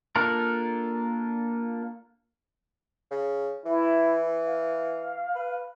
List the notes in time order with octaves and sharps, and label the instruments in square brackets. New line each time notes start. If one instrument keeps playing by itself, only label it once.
[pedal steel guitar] A#3 D4 F4 A4 A#4
[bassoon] C#3
[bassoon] E3 [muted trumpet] E4
[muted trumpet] F5
[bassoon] B4